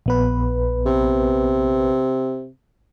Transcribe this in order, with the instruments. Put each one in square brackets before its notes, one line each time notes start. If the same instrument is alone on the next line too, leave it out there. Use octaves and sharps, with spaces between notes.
[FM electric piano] A#1 B3 B4
[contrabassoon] C3